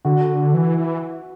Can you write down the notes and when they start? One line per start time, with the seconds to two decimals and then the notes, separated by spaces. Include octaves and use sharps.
0.05 D3 F#4
0.30 D3
0.54 E3
0.78 E3